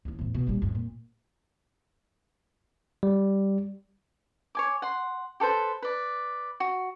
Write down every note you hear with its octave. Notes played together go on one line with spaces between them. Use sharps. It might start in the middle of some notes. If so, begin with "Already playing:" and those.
D#2 E4
E2 A2
B2
A#1 G3
F2 G#2
A#2
G3
C#5 G#5 D6
F#5 C6
G4 A4 B4 C5
B4 D5
F#4